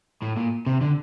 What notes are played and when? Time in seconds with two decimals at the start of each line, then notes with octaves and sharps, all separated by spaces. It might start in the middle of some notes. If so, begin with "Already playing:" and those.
0.22 A2
0.36 A#2
0.66 C3
0.81 D3